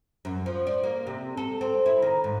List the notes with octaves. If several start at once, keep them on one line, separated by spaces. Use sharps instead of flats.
F#2
F3
D5
A#3
C3
A4
C4
E4
D#3
G#2